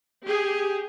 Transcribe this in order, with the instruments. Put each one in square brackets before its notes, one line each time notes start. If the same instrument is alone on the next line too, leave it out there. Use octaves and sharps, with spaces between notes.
[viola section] G4 G#4